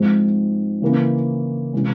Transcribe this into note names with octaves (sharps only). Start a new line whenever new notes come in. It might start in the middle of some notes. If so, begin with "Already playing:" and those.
Already playing: G#2 F3 G#3 C4
C#3 E3 A#3 C#4
C3 E3 G#3 C#4